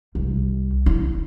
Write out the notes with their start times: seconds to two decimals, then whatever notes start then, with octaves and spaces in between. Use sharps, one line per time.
0.15 C2
0.86 E4